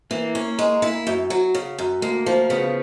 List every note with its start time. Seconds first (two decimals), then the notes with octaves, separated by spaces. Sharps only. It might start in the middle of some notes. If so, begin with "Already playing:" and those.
0.11 E3 A#3
0.35 C#4
0.59 G#3
0.82 E4
1.07 F#2
1.30 F#3
1.55 C#3
1.78 F#2
2.02 D2 A#3
2.26 F3
2.50 C#3 B3